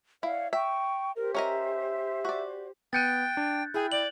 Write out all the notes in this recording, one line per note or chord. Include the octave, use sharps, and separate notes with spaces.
E4 C#5 D5 F5 F#5
E5 G5 C#6
G4 A#4 C5
C#4 A#4 D#5 E5
F#4 D5
B3 G5 F#6 G6 A6 C#7 D#7
D4
E4 G#4 G5
D5 F#7